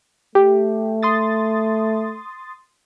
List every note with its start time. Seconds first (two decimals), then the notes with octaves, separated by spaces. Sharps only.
0.35 A3 G4
1.03 C6 D#6 A6